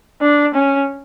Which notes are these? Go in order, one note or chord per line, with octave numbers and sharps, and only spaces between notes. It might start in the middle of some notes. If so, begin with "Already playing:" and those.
D4
C#4